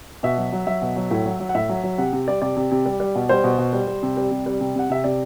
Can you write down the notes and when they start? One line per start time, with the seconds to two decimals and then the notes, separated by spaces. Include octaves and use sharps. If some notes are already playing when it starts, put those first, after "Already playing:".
0.23 B2 E5
0.38 F#3
0.52 F#3
0.67 F#3 E5
0.82 B2
0.96 F#3
1.11 A2
1.26 F#3
1.40 F#3
1.49 F#5
1.55 A2 E5
1.69 F#3
1.83 F#3
1.98 C3 F#5
2.13 C3
2.28 G3 D5
2.42 C3 D5
2.57 C3
2.71 C3
2.85 G3
3.00 G3
3.15 B2
3.29 G3 C5
3.44 B2
3.58 B2
3.73 G3
3.87 G3
4.03 C3
4.17 G3
4.31 C3
4.46 G3
4.61 C3
4.75 C3 F#5
4.90 C3 E5
5.04 C3 D5